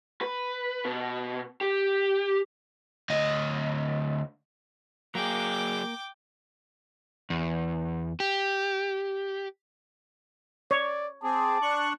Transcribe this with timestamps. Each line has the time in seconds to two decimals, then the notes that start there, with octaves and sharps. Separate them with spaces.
0.21 B4
0.85 B2
1.61 G4
3.10 D2 D#5
5.15 F#3 A#3 G#4 G5 D6
7.30 E2
8.20 G4
10.71 C#5 D5
11.24 C4 G#4 A5 D6
11.62 D4 C#6 F#6